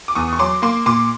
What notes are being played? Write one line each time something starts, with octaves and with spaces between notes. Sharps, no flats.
D6
E2 C#6 D#6
C#6
F#3 C6 D6
A#3 C6 D6
A#2 C6 D6